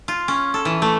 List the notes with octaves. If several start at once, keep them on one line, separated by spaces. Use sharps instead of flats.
F4
C#4
A4
E3
A3